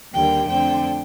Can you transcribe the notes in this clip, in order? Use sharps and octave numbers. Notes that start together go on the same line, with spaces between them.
D#2 D3 G3 A#3 G5
F2 D3 A3 C4 G5